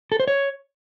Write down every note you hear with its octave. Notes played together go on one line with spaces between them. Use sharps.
A4
C5
C#5